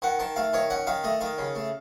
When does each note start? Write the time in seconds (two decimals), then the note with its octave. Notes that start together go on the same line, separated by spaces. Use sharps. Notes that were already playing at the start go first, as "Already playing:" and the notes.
0.02 D#3 F#5
0.19 D#3 A5
0.36 A3 F5
0.53 D#3 C#5
0.70 C#4 F#5
0.87 D#3 F5
1.04 A3 D#5
1.21 D#3 F5
1.38 C#3
1.55 A3